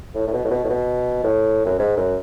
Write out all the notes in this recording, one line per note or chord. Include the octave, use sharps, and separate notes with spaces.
A2
A2
B2
A2
B2
A2
B2
A2
F#2
G#2
F#2